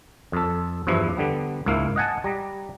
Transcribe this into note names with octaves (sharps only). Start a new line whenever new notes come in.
F2 A4
E2 G2 F3 E4
D3 G3 B3
C#2 G#2 A#3 E4 F5
D#5 F#5 G#5 A5
G3 A#5